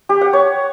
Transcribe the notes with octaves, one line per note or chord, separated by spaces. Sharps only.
G4
F#5
C#5